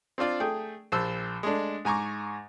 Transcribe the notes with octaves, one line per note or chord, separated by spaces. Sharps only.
C4 D4 F4 D5
A3 G#4 G5
A#1 C5 A5 E6
G#3 A3 D4
G#2 G#5 A#5 C#6 D6